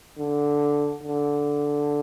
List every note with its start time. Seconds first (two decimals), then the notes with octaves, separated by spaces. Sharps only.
0.19 D3
1.03 D3